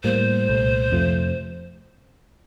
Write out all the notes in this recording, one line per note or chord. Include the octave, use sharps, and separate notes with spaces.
A2 G3 A#3 C5
C2 A#2 A3
F2 C3 F3 A3